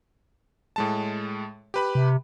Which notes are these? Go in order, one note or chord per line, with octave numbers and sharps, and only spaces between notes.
A2 G#3 A5
G4 B4 B5
C3